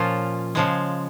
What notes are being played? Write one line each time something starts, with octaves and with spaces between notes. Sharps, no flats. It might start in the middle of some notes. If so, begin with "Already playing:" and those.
Already playing: A#2 F3 C#4 F4
C#3 F3 G#3